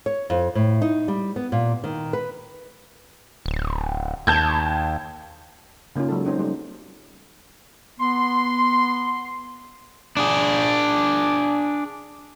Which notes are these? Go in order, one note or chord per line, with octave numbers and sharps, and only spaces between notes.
C#5
F2
A2
D#4
G3
B3
A#2
D#3
B4
D1
D#2 A5 G6 G#6
C#3 A#3 C#4 D#4 F4
F#3 G#3 A4
C4 C#4 D#4 C5
G3 A3 D#4
B3 C6
D4 G#4